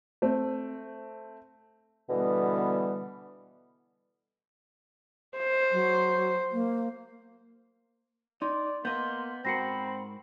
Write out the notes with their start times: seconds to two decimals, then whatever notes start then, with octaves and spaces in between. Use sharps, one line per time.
0.22 A3 C4
2.10 B2 D3 E3 G3 B3
5.38 C5
5.72 F#3
6.53 A#3
8.42 D#4 D5 C6
8.85 A#3 B3 D#5 C6 G6
9.45 G#2 C4 F#4 A#4 B5 A#6 C7 C#7